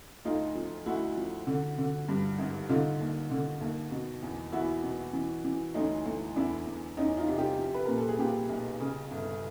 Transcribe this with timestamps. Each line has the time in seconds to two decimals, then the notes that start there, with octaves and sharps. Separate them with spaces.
0.25 D2 D#4 F4
0.55 F3
0.86 D2 E4 F#4
1.16 F3
1.47 D3
1.78 D3
2.09 G2
2.38 G#1
2.69 D3 D#4 F4
3.00 D#2
3.31 D3
3.61 D#2
3.91 B2
4.23 E2
4.52 E2 E4 F#4
4.83 B2
5.13 E3
5.44 E3
5.74 D2 C#4 D#4
6.06 D2
6.36 E2 D4 E4
6.66 E2
6.97 E2 C#4 D#4
7.17 D#4 F4
7.28 C3
7.37 F4 G4
7.58 F3
7.74 B4
7.85 A#2 A#4
7.96 A4
8.08 G#4
8.19 A#2 F4 G4
8.49 B1
8.80 C#3
9.11 G1